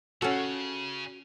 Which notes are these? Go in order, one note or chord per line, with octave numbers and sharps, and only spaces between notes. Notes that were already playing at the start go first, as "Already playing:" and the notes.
C#3 C#4 F#4 A4